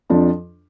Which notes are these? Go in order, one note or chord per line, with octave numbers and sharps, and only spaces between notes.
F2 F3 D4